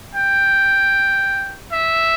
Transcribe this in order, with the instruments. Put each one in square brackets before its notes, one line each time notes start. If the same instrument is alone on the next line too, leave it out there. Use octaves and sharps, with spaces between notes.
[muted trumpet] G5
E5